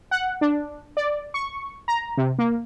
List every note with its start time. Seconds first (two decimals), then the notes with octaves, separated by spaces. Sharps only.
0.11 F#5
0.41 D4
0.97 D5
1.34 C#6
1.88 A#5
2.17 C3
2.39 A#3